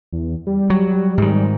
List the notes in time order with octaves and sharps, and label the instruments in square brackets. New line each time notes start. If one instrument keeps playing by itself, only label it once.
[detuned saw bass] E2
G3
[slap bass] F#3
G#2 D#3